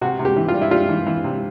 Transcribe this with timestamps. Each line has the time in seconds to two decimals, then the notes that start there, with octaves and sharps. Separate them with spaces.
0.01 C3 F#4
0.19 C3
0.25 G4
0.36 E3
0.48 F4
0.54 G3
0.61 E4
0.71 G3 F4
0.89 E3
1.06 E3
1.24 C3